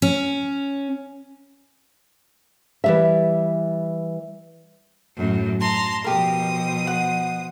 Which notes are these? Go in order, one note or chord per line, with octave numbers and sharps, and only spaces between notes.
C#4
E3 G3 E5
F#2 A2
A5 A#5 C6
B2 F3 G4 A#4 D#6
F#5